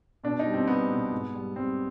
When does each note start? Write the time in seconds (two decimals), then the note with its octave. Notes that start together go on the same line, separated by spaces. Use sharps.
0.24 B2 D4
0.39 D#4
0.46 G3
0.53 C4
0.67 G3 B3
0.90 B2
1.13 G#2
1.34 G3
1.56 G3 C4